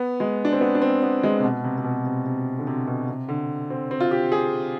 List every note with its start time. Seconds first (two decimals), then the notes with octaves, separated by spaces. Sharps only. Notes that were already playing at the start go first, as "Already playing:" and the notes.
Already playing: B3
0.20 G#3
0.45 D4
0.53 C4
0.61 B3
0.75 D4
0.82 C4
1.03 B3
1.23 G#3
1.40 C3
1.44 B2
1.64 C3
1.78 C3
1.84 B2
2.05 C3
2.26 C3
2.59 D3
2.67 C3
2.87 B2
3.08 C3
3.29 D3
3.70 C4
3.91 C4
4.00 F4
4.11 G4
4.32 G#4